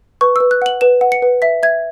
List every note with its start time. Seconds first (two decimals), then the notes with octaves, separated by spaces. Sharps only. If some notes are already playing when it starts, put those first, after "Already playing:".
0.21 B4 C#6
0.36 B4 E6
0.51 F#6
0.62 F#5 F#7
0.81 B4 E7
1.01 F#5
1.12 C#7
1.22 B4
1.42 E5 B6
1.63 E5 G#6